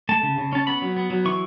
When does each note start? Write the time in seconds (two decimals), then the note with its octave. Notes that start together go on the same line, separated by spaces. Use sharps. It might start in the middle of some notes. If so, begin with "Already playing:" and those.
0.09 A3 A5
0.23 C#3
0.38 C#3
0.53 C#4 A5
0.67 B3 B5
0.82 F#3
0.96 B3
1.10 F#3
1.25 E3 C#6